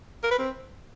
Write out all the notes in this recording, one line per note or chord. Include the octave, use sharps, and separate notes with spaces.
A#4
B4
C4